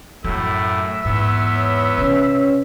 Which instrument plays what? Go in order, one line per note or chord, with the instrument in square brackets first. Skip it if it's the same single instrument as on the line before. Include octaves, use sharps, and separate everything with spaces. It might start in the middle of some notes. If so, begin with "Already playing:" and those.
[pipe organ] F#2 A2 [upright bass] A3 [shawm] E5
[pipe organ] E2 B3 [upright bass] G#2
[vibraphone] C#5
[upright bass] C3 [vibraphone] C#4 B4 C#5